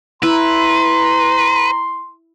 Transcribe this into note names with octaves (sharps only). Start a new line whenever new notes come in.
E4 B4 A#5 C6